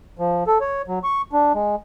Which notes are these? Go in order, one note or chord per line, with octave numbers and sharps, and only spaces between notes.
F3
A4
C#5
F#3
C#6
D4
G#3